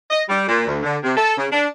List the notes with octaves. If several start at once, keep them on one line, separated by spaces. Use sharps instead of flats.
D#5
G3
A#2
D2
D3
C3
A4
C#3
D4